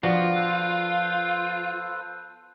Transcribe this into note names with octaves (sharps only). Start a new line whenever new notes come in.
F3 B3 D4 F4 F#4
A4 B4 C5